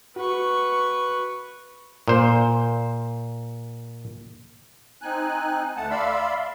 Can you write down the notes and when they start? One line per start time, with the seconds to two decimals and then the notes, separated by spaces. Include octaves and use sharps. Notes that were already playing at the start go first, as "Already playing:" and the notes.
0.16 F#4 B4 C#6
2.08 A#2 C5
5.01 C4 D#4 G#5 F#6
5.77 D2 A3 F#5 A5
5.90 D5 E5 F5 B5 C6 E6